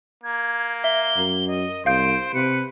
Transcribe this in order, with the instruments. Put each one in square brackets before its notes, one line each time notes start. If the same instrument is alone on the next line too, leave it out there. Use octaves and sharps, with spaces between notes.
[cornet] A#3 [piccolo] G#6
[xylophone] E5 [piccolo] G7
[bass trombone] F#2
[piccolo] D#5
[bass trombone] C2 [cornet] C5 [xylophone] F5 G6 [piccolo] D7
[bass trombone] C3 [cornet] B4 [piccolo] C#7